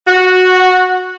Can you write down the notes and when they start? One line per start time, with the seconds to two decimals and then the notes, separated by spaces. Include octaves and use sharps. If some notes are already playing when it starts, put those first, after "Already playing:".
0.07 F#4